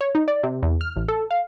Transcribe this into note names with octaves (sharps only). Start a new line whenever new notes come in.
C#5
D#4
D5
C3
E2
F6
A1
A4
F5